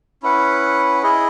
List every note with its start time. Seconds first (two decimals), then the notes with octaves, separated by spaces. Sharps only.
0.23 C#4 E4 B4 F#5
1.03 E4 G#4 D#5